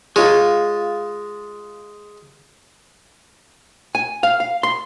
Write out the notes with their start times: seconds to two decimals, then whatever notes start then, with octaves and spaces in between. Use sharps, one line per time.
0.16 G#3 F4 C#5
3.95 G#5
4.23 F5
4.40 F5
4.63 C6